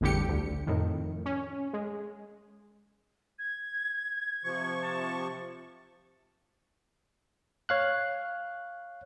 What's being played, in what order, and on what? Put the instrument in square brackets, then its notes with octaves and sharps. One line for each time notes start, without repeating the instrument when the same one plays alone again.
[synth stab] A1 E2 D3 G3 G4 C#7
D2
F2 A2 D#3
C#4
G#3
[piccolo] G#6
[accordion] C3 F3 C#6
[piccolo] A5
[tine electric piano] C#5 F5 F#6